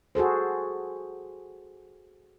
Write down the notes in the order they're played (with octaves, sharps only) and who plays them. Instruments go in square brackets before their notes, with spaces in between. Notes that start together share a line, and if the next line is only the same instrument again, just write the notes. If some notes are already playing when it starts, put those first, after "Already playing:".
[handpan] F#4 G#4 A4 C5